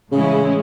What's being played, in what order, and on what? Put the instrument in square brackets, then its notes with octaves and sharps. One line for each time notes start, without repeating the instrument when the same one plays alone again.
[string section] A2 E3 G#3 C#4 E4 [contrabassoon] C#3